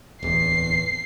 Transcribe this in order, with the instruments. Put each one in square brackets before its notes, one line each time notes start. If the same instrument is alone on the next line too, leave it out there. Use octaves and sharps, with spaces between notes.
[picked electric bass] D1 E2 [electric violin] C7